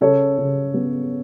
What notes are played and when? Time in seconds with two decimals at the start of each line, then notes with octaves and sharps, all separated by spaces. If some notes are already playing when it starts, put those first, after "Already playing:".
0.01 C#3 A4 C#5
0.38 C#3
0.74 B3